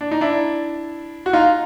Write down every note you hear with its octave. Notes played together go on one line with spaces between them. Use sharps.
D4
D#4
D4 E4
F#4
D#4 F4